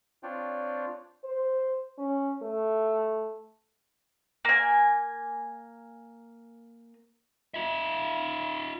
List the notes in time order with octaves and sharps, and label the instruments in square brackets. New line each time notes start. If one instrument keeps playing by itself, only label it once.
[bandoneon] C4 D4 F4 C#5 D5 G5
[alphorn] C5
C#4
A3
[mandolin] A#3 G#5
[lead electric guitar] F4 E5